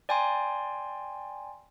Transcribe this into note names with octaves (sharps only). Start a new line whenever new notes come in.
D5 G5 G#5 A#5 C6